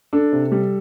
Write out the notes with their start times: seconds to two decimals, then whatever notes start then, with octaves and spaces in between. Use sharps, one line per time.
0.13 D4 A4
0.32 C3
0.52 G3